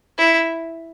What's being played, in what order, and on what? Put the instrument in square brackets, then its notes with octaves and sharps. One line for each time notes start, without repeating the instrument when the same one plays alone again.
[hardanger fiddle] E4